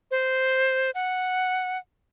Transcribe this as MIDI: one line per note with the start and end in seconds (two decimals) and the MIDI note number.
0.11 0.91 72
0.95 1.78 78